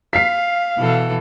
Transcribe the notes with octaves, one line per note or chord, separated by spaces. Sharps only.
F5 B6 C7
B2 E3 A4